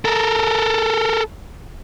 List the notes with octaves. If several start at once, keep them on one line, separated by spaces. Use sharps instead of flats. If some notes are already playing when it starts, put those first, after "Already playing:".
A4 A#4